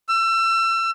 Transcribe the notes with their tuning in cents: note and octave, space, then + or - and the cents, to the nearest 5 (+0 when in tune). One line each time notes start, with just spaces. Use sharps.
E6 +30